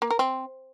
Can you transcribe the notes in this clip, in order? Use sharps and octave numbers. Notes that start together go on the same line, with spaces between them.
A#3
A#4
C4